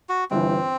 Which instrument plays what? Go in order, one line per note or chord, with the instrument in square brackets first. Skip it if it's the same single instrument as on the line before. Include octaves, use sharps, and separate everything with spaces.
[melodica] F#4
[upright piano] G1 G2 E3 [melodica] C4